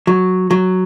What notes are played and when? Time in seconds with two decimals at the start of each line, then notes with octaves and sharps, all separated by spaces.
0.07 F#3
0.51 F#3